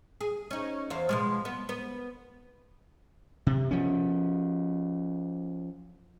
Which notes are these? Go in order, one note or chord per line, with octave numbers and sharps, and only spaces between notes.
G#4
C#4 D#4
E2 C5 F5
B2 F3 G#3
B3
B3
C3
F3 C#4